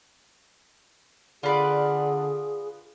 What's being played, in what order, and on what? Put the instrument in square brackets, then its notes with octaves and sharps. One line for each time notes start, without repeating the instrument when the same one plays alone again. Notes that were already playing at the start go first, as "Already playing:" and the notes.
[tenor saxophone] D3 [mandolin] F4 B4 D5 [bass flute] G#4